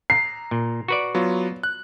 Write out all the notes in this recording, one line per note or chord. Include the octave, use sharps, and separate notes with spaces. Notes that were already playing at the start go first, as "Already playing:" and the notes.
A#5 C7
A#2
F#4 B4 D5
F#3 B3 F4
F#6